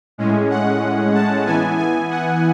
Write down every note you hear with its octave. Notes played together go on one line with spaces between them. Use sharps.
A2 G#3 C#4
F#5
A5
E3 B3 G#5
G#5
F#5